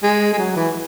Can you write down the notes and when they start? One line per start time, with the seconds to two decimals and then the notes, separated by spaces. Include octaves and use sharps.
0.03 G#3
0.33 G#3
0.38 F#3
0.56 E3